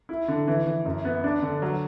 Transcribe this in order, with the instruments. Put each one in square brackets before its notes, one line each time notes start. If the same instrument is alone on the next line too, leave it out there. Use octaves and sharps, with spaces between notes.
[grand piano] E4
D3
E3
E3
F#2
B3
D4
D3
F#3